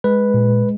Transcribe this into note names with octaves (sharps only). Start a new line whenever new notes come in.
G#3 B4
A#2